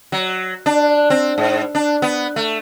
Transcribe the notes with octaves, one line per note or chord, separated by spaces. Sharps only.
F#3
D4
C4
G#2
D4
B3
A3